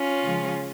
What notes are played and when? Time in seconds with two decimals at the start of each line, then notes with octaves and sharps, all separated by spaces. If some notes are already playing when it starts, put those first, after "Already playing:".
Already playing: C#4 F4
0.23 C#3 F3 G#3